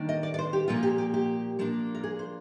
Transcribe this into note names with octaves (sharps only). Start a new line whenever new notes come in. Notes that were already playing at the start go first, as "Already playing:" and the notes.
Already playing: D#3 A#3 D4
D#5
D5
D5
C5
G4
A#2 F3 A#3 F4
G4
G4
G4
F3 A#3 D4
A#4
G#4
C5